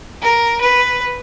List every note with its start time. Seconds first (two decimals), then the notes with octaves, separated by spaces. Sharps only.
0.22 A#4
0.61 B4